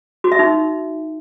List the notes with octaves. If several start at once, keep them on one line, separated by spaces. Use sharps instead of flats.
F#4
E5
D#4